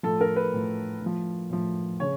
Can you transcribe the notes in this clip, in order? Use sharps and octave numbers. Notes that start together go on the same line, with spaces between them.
A2 F3 A4
A#4
B4
A2 F3
A2
F3
A2 F3
C#3 C#5